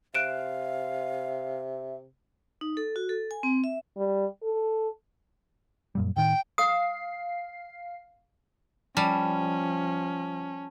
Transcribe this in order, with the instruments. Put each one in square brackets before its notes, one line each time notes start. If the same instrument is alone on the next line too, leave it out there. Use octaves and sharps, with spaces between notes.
[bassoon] C3 [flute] E5 [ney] F5 [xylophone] F#6 D7 E7
[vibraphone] D#4
A4
F#4
A4
G#5
C4
E5
[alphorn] G3
A4
[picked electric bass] F#2 A#2 G3
[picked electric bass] A2 D#3 [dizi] G5
[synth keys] F5 C7 [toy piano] D#6
[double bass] F3 [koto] G3 [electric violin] C#4 [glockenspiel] A5